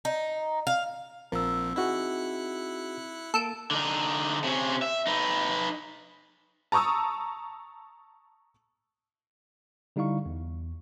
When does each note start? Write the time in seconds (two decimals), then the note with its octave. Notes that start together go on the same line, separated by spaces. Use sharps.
0.05 D#4
0.67 F5
1.32 A#1 F3 C4 A#4 E6
1.76 D#4 E4 F#4 G#4 F#6 C#7
3.34 A#3 A4 A5 E6 D7
3.71 D3 D#4
4.44 C3 C#4
4.82 E5
5.07 D#4 B4
6.72 A5 A#5 C#6 D#6 E6
9.96 D3 G3 D#4 E4 F5 C#6
10.26 E2